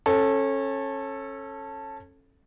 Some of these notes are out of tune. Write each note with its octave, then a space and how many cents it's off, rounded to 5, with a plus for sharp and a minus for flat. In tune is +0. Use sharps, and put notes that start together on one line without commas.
C#4 -25 A4 +0